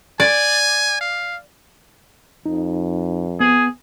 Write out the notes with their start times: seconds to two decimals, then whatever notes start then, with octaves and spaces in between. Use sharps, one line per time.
0.20 D5 G#5
1.01 F5
2.46 F2 D#4
3.40 B3 G#4